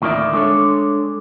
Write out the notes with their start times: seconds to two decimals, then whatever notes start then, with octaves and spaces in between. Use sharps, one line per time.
0.02 D2 A2 D#3 A#3 D5 E5
0.33 G#3 D4 A4 C#5